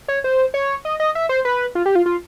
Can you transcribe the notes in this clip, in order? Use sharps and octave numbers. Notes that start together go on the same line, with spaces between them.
C#5
C5
C#5
D#5
D#5
E5
C5
B4
F4
G4
F4
F4